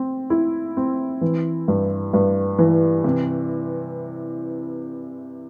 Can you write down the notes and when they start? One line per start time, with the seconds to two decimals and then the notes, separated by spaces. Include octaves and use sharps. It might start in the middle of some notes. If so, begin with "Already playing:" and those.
Already playing: C4
0.30 E4
0.77 C4
1.21 E3
1.68 G2
2.13 G2
2.58 E3
3.04 C3